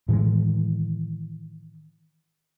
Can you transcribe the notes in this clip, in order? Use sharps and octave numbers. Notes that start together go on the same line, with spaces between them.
A2 D#3 E3 G#3